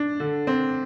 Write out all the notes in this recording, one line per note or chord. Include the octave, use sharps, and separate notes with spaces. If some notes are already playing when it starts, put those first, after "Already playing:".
Already playing: D4
D3
C4